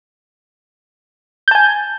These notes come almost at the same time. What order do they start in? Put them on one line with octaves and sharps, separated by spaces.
G6 A5 G#5